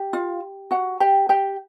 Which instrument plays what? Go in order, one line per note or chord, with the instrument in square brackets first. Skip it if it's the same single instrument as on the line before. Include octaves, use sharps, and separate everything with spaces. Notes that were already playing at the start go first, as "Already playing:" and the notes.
Already playing: [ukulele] G4
F4 F5
F#4 F#5
G4 G5
G4 G5